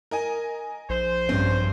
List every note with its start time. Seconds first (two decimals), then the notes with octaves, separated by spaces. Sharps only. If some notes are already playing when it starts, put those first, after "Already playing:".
0.11 A#4 D#5 G#5
0.89 A#1 C5
1.29 G2 C4 C#4